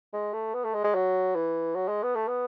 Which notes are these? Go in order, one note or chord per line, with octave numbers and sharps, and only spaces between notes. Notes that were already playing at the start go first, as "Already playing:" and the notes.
G#3
A3
B3
A3
G#3
G#3
F#3
E3
F#3
G#3
B3
A3
B3